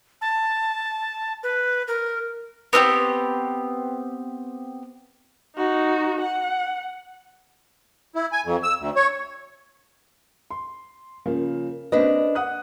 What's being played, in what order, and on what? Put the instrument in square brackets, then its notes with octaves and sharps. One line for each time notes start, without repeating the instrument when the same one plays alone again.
[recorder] A5
B4
A#4
[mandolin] B3 C4 F4 G4
[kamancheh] D#4 F#4
F#5
[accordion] E4
G#5
F2
E6
D2
C#5
[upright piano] C6
C#3 F3 A#3
[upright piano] A#3 C4 [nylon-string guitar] D4 B4 D#5
[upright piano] F#5 D#6 F#6